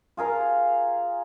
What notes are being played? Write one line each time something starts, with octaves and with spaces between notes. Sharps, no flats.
F4 G#4 A#4 F5